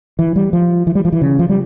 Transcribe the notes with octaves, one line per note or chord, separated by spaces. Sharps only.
E3
G3
F3
E3
G3
F3
E3
C#3
F3
G3